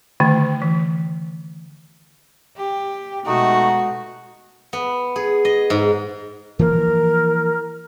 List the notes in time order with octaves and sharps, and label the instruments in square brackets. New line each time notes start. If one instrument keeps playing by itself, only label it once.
[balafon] D3 D#3 A3
E3
[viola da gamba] G4
[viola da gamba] B2 G#3 [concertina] A3 D#4 [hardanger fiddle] F#4
[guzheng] B3
G#4
D#5
G#2
[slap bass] E3 F3 A#3 [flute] A#4